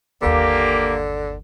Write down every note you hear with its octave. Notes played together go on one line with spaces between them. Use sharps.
G1 D#2 D3 A#3 G4